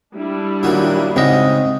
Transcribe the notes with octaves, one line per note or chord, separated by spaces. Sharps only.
G3 D4 E4
A#2 D#3 F#3
G#2 C#3 C4 D#5